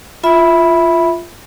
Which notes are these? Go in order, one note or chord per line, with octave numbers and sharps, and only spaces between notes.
F4 E5 B5